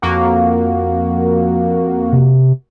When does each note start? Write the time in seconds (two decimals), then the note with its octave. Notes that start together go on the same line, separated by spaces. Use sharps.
0.02 F2 A#3 F#4
2.12 C3